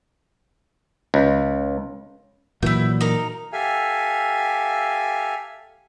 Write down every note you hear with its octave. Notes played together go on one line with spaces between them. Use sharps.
C#2
A#2 E3 F#3 E4 G6
D#4 A#4
G4 A4 E5 F5 G#5